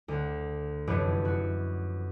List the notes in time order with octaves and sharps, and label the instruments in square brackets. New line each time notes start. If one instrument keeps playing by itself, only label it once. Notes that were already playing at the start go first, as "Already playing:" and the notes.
[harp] D2 F#5
F1 F#2 E3 B4 C#5
F#4